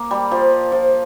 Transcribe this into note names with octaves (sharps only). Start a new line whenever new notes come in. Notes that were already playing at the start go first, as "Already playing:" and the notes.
Already playing: A#3
G3
F3
F3